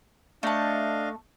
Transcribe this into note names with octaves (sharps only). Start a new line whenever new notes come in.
A3 D4 D#5 F5 A5